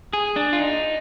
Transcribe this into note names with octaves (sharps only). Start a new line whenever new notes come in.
G#4
D4
F4
D#4